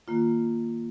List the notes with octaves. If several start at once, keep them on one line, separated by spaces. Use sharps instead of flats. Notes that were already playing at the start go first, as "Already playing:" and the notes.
D#3 A#3 F4